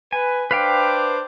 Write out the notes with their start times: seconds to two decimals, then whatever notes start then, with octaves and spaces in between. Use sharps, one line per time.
0.12 B4 G#5
0.51 D4 B4 C5 F5 G5 D6